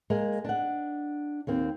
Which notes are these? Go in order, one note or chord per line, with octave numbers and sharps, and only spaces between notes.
G#3 A#3 A#4
D4 F#5
D#2 A#3 C4